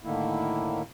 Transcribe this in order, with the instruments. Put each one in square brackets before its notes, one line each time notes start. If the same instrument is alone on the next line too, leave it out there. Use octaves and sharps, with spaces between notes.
[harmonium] A2 D3 D#3 A#3 E4